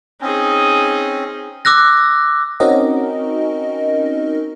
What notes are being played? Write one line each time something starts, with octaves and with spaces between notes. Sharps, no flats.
C4 C#4 D#4 G#4
D6 E6 F#6 A#6
C4 C#4 D#4 F#4 A#4 D#5